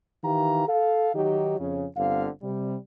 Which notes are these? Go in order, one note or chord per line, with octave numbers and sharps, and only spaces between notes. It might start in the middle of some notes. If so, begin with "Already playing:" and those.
D#3 E3 G4 F5 A#5
A4 F5
D#3 F#3 D#4 G4
F2 C#3
G1 D3 C4 F5
C3 G3